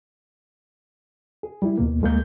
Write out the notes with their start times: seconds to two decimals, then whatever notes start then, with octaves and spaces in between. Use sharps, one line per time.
1.43 G#4
1.62 G3 E4
1.78 D#2 B2 A#3
2.02 D2 G#3 A#3 G6